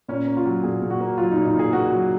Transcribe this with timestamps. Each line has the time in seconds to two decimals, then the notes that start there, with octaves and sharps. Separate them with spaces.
0.08 A#2 C#4
0.27 A#3
0.37 F4
0.45 F#3
0.63 A#2 G#4
0.82 A#2
0.90 F#4
1.00 A#3
1.17 F#3 F4
1.31 A#2 D#4
1.45 D#4
1.54 A#2 G#4
1.73 A#3 F#4
1.90 F#3